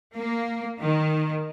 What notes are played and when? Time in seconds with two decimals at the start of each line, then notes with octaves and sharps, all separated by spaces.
0.16 A#3
0.82 D#3